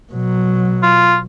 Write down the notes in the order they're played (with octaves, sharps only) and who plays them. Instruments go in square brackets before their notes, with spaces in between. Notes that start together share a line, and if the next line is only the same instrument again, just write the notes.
[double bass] B2 F#3
[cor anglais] F4